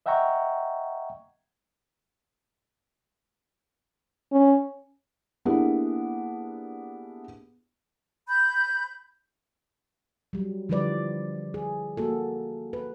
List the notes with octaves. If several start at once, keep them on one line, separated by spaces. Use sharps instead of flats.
D#5 E5 F#5 G5 A#5 C#6
C#4
A#3 B3 D4 E4 G4 G#4
B5 G6
F#3 G3
D3 E3 F3 G3 B4 D5
G#4
A#3 F#4 A4
B4